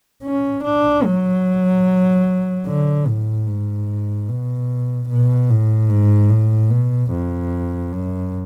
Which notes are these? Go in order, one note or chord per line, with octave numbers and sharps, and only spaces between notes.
C#4
D4
F#3
D3
A2
G#2
B2
B2
A2
G#2
A2
B2
F2
F#2